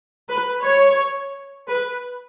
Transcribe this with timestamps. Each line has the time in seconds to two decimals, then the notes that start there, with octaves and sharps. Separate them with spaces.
0.29 B4
0.63 C#5
1.67 B4